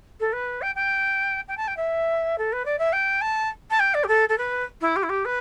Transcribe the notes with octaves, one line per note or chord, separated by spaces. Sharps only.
A4
B4
G5
G5
G5
A5
G5
E5
A4
B4
D5
E5
G5
A5
A5
G5
D5
G4
A4
A4
B4
E4
G4
E4
G4
B4